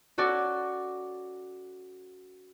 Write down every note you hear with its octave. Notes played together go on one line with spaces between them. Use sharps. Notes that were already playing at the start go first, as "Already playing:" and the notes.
C#4 F#4 A4 D5